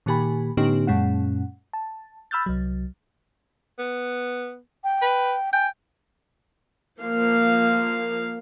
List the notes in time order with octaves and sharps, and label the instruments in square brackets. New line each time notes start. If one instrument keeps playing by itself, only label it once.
[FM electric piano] A#2 D#3 A#3 G4 G#5 B5
A2 D3 B3 C#4 D#4 G4
F#2 A#2 G#3 C#4 F#5
A5
B5 E6 F6 G6 A6
C2 F#3
[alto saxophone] B3
[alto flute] G5
[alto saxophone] B4
[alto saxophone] G5 [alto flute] G#5
[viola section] F3 A#3 F5